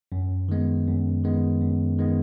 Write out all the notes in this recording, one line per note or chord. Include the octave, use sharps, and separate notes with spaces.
F#2
D#3 G#3 B3
F#2
D#3 G#3 B3
F#2
D#3 G#3 B3